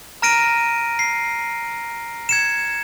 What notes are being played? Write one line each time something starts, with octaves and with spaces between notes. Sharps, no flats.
A#5 F6 A#6 D7 D#7
C7
G#6 C#7 E7